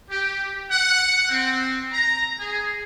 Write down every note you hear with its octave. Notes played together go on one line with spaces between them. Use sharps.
G4
F#5
C4
A#5
G#4